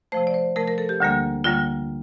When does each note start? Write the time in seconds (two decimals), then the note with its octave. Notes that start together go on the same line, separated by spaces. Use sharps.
0.12 C3 F3 A3 C5
0.27 D5
0.34 C5
0.56 C3 F3 A3 A#4
0.68 A#4
0.78 A4
0.89 G4
1.00 D2 D3 G3 A#3
1.44 D2 D3 G3 A#3 F4